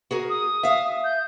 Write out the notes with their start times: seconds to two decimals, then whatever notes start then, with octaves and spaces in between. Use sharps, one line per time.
0.11 F#4 G#4 A#4
0.29 D#6
0.63 E5 F5
1.04 G6